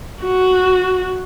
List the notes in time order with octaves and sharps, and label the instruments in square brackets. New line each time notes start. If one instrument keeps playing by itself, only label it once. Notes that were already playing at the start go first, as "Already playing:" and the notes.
[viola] F#4